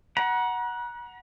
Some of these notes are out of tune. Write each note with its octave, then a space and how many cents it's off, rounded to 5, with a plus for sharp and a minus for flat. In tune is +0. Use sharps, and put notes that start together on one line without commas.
F#5 +0 A#5 +40